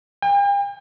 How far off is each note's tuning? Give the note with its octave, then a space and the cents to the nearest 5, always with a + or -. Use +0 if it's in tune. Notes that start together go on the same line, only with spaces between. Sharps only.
G5 +45